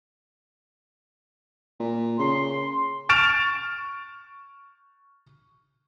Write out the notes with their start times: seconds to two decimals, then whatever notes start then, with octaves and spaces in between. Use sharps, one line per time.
1.80 A#2
2.19 C#3 C6
3.09 C#6 F6 A6 D7 E7 F7